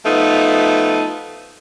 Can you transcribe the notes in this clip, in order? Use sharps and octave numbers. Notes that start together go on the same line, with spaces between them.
F3 A3 B3 D#4 F4